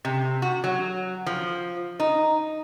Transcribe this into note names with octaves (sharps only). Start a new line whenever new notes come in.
C3
F#4
F#3
F3
D#4